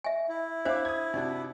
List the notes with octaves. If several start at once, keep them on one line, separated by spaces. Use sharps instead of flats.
E5 G#5
E4
D4 C5 E5 F5 D6
D#6 G#6
C3 D4 D#4 F#4